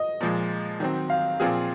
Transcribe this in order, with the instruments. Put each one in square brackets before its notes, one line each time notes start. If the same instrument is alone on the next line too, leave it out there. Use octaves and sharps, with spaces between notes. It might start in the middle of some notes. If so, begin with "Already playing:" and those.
Already playing: [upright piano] D#5
[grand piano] A#2 F3 G#3
D#3 F#3 C4
[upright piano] F5
[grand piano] A#2 F3 C4 F4 G#4